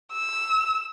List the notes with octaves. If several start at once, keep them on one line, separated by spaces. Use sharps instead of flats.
E6